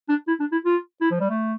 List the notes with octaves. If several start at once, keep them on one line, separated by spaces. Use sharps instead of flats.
D4
E4
D4
E4
F4
E4
F3
G3
A3